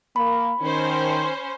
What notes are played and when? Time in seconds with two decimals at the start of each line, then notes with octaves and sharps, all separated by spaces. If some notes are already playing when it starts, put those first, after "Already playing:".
0.16 A#3 B5
0.62 D#3 C#4 C5